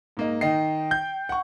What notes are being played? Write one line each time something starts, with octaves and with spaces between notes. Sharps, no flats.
G#2 A#3 D#5
D#3 D#5 G5 C7
G6
F#5 C#6